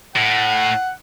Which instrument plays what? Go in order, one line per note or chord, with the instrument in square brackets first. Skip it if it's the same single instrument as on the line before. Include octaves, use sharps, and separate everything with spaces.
[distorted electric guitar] A2 [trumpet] F#5